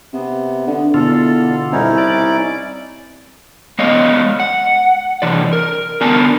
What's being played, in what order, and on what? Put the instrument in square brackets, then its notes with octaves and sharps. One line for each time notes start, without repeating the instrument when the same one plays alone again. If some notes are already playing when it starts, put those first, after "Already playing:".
[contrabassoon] C3 [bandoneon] B3
[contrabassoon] D3
[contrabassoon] E2 [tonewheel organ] B2 D3 F4 [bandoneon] A4
[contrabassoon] C2 [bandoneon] C#4 D#4 E4
[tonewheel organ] D5
[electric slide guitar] G#3 B3 C#5 D#5 F5
F#5
C3 E3 D5
A#4
D3 B3 A#4 D5 G#5 A5